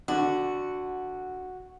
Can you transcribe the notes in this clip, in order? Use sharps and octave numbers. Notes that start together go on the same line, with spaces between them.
D3 F#4